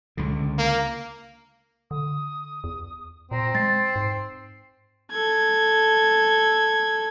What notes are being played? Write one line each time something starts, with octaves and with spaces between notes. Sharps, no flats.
C#2 D3
A#3
D3 D#6
E2
A#2 C4 A#5
G#3 A6 C7
G#2
A4 G#6